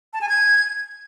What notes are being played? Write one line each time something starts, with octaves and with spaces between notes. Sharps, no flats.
A5
G#5
G#6